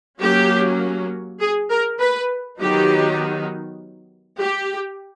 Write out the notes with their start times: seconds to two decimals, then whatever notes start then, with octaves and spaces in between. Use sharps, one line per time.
0.20 F#3 A#3 C#4 G4
1.40 G#4
1.70 A#4
2.00 B4
2.60 D#3 F#3 B3 D#4 G4
4.39 G4